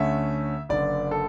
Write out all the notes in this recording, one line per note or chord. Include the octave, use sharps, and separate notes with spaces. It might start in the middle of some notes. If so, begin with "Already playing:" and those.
Already playing: D2 D3 A3 C#4 E5
F#1 F#2 D3 D5
A4